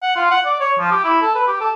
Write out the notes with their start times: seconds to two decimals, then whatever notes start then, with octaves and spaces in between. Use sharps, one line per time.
0.03 F#5
0.16 F4
0.31 F#5
0.46 D5
0.60 C#5
0.79 F3
0.91 G4
1.04 E4
1.22 A4
1.35 B4
1.48 G4
1.61 A4